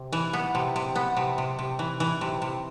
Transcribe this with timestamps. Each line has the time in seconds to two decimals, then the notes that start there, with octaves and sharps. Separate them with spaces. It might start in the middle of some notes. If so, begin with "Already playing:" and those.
Already playing: C3
0.13 E3
0.33 B3
0.55 C3
0.76 C3
0.95 B3
1.17 C3
1.38 C3
1.59 C3
1.79 E3
2.00 E3
2.21 C3
2.42 C3